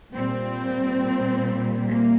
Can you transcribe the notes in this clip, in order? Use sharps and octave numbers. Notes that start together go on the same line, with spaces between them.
A#2 G3 C4
A#3